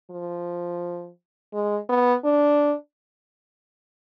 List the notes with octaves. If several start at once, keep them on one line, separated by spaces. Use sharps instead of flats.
F3
G#3
B3
D4